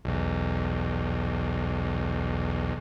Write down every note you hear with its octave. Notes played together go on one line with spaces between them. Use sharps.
B1 E2